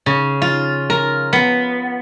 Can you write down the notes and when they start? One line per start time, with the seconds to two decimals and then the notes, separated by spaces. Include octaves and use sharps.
0.06 C#3
0.42 F4
0.90 A#4
1.33 B3